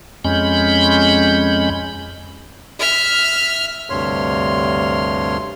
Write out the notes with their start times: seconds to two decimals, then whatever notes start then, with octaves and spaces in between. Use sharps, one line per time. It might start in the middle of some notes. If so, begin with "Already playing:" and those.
0.24 F2 G#3 C#4 B5 G6
2.79 E5 F6
3.90 D2 G2 C3 C#5 C6 F6